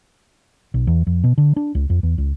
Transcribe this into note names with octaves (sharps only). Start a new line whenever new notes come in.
B1
E2
F2
B2
D3
D4
C#2
F2
E2
C#2